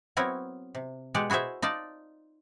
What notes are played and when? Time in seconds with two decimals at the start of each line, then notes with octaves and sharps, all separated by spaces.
0.17 F#3 B3 C4 E4 A#4 C#5
0.75 C3
1.14 B2 G#3 G4 D5 F#5
1.30 E4 F#4 G#4 C5 E5
1.62 D#4 F4 D5 A5